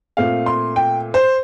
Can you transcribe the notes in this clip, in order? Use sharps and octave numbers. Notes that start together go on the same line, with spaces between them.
A#2 A3 C4 F5
C6
G5
C5